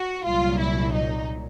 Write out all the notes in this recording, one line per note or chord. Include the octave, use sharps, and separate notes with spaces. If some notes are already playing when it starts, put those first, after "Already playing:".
Already playing: F#4
C2 A#2 F#3 F4
E4
D#4